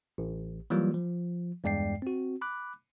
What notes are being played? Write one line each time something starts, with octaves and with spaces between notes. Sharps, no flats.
A1
E3 F#3 G3 A#3 F4
F3
E2 G2 G#3 D5 G5 C7
C4 F#4
B5 D6 F#6